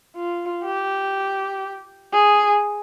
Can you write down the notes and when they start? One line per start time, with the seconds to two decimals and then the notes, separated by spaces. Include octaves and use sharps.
0.16 F4
0.65 G4
2.13 G#4